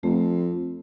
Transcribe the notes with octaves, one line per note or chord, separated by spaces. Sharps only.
F2 A3